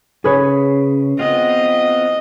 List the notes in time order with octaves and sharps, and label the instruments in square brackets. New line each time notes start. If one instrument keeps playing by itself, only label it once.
[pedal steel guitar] C#3 [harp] G#4 B4 C#5
[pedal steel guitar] B3 C4 F4 [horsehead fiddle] D#5